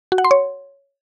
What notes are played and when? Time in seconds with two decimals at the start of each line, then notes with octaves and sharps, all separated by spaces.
0.12 F#4
0.18 F#5
0.24 C6
0.31 C#5